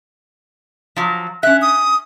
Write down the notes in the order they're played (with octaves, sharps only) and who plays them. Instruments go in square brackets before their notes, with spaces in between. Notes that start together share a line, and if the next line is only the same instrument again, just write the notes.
[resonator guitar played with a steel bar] F3 F#3
[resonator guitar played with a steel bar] C#4 E5 [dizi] F#6
[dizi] D#6